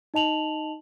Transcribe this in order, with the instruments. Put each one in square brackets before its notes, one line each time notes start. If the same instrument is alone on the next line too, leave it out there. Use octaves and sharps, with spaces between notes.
[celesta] D#4 D#5 A5 F7 F#7